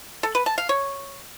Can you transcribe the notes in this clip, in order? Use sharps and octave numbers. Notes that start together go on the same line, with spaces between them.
A4
B4
A5
F5
C#5